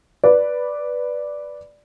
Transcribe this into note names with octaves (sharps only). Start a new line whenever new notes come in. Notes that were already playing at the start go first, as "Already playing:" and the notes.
B4 D5